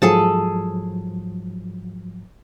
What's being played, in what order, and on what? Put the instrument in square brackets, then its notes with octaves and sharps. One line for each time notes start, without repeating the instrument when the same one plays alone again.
[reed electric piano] G#2 F3 F#3 [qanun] G#4 A4 A5